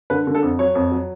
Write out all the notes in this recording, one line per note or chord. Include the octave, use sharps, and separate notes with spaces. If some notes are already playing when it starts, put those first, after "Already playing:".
D3 B4
D3
A4
F2
F#3 C#5
F2
F#3